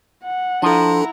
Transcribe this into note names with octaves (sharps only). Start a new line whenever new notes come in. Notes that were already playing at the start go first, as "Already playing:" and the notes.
F#5
F3 D4 E4 A4 A#5